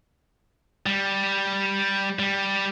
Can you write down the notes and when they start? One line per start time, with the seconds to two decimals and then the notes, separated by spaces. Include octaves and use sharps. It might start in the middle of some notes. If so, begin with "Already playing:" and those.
0.86 G3
2.19 G3